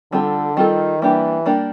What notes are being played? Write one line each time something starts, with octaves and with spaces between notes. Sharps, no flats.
D3 G3 C4 F4 A4
D#3 G3 C4 F4 A4
E3 G3 A#3 D4 G4
G3 A#3 D4 G4